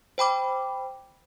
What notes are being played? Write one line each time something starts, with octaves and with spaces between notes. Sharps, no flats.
C5 G5 B5 D6